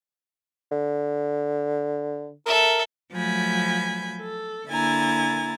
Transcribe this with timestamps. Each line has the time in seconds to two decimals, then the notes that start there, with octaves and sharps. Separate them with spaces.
0.71 D3
2.46 A4 A#4 E5
3.15 F3 F#3 A3 G#5 B5 G6
4.20 A4
4.69 D3 A#3 E4 G#5 A#5 A6